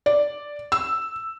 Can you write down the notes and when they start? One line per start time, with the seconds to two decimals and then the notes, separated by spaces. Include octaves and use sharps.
0.06 D5
0.72 E6